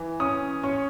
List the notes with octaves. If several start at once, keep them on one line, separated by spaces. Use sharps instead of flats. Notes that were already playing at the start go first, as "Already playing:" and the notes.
Already playing: E3
C#4 D#6
C#4 C#6